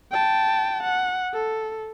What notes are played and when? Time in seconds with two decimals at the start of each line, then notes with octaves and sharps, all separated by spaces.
0.12 G5 A5
0.83 F#5
1.34 A4